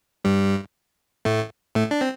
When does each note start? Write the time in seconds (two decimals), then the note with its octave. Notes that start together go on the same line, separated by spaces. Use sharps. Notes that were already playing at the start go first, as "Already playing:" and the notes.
0.25 G2 G3
1.25 A2 A3
1.75 A2 A3
1.91 D4
2.01 C4